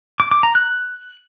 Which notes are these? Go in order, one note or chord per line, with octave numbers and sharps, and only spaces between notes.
D6
D6
A#5
F#6